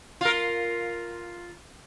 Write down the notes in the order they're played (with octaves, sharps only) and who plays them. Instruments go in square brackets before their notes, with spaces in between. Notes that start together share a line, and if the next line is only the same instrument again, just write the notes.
[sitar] F4 A#4